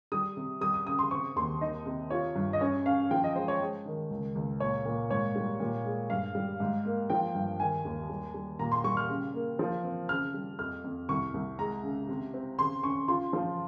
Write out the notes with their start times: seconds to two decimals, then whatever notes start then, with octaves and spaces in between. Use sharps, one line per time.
0.12 G3 D#6
0.37 C3
0.61 G3 D#6
0.74 D#6
0.86 C#3 D#6
0.99 C6
1.11 C4 C#6
1.36 D#2 C6
1.61 D#4 D#5
1.86 C3
2.10 F4 C#5
2.36 G2
2.53 D#5
2.61 C#4 C#5
2.86 C#4 F5
3.11 F3 G5
3.24 D#5
3.36 G#3 C5
3.48 C#5
3.61 G#3
3.86 D#3
4.11 C#2
4.35 C#2
4.60 A#2 C#5
4.85 A#2
5.11 G#2 C#5
5.36 G3
5.60 A#2
5.85 G#3
6.10 G2 F5
6.35 G3
6.60 G#2
6.85 A#3
7.10 F3 G5
7.35 G2
7.60 D#3 G#5
7.85 D#2
8.10 G3
8.34 G3
8.59 A#2 A#5
8.72 C6
8.84 G3 C#6
8.97 F6
9.09 C#3
9.34 A#3
9.59 F3
9.84 C4
10.09 C#3 F6
10.34 G3
10.59 F2 F6
10.84 F2
11.09 C2 C#6
11.34 C2
11.59 G#3 A#5
11.83 C#3
12.08 C3
12.34 C4
12.58 C#3 C6
12.83 C#4 C#6
13.08 F4 C6
13.33 F3